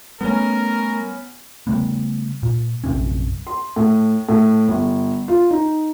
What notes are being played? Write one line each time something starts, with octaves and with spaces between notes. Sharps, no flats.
G3 A3 B3 C#4 A#4
C#3 G3 A3 B3
A#2
A#1 F#2 C3 C#4
C6
A2
A2
G1
F4
D#4